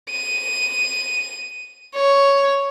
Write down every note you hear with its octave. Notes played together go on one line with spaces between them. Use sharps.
D#7
C#5